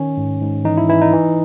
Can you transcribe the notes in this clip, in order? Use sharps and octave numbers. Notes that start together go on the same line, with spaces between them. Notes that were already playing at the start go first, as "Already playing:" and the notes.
Already playing: D#3 C#4
G#2
G#2
E3 D#4
E4
E3 E4
D#4
E3